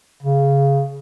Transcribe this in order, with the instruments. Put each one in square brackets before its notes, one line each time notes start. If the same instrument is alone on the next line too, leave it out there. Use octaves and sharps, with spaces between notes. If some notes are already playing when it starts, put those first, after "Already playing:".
[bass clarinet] C#3